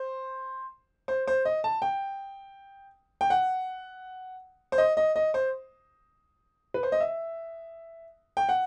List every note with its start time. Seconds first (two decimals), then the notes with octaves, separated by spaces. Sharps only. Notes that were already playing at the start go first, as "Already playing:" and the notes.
Already playing: C5
1.08 C5
1.27 C5
1.45 D#5
1.64 A5
1.82 G5
3.21 G5
3.30 F#5
4.72 C5
4.78 D#5
4.97 D#5
5.16 D#5
5.34 C5
6.74 B4
6.83 C5
6.92 D#5
7.00 E5
8.37 G5
8.49 F#5